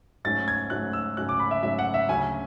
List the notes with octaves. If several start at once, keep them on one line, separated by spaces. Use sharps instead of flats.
G#2 F#3 A3 C#4 A6
G#6
G#2 F#3 A3 C#4 F#6
E6
G#2 F#3 A3 C#4 F#6
D6
B5
E5
G#2 F#3 A3 C#4 E5
F#5
E5
D2 C#3 F#3 C#4 G#5